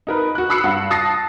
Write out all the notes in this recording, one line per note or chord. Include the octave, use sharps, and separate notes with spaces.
D#4 A#4 B4
F#4 F#6
B5 D#6 E6 F#6 C7 C#7
G2 F#5
A5 D#6 A6 A#6 C7